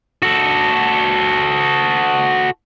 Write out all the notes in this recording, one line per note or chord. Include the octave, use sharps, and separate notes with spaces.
F#4 A4